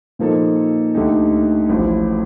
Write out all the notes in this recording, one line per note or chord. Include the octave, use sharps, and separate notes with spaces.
A#2 F3 A#3 D#4 A4
D2 D3 A3 D#4 G4
A1 A2 F3